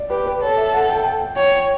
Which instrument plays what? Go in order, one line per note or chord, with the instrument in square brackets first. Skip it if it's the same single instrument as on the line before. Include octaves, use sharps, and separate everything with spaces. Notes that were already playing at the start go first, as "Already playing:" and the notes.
Already playing: [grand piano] D5
[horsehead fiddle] G4 [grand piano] B4
[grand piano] B4
[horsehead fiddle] A4 [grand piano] C#5
[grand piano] E5
F#5
G5
A5
G5
G5
[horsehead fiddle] C#5 [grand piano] G5